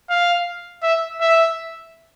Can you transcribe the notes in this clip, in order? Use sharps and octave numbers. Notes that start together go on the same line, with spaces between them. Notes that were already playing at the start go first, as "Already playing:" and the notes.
F5
E5
E5